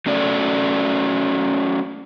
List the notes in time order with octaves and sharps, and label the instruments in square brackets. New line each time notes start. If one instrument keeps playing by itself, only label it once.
[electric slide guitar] F#3 A3 C#4 A4 D5